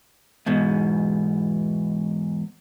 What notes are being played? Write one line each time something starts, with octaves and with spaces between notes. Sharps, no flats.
E2 G#2 B2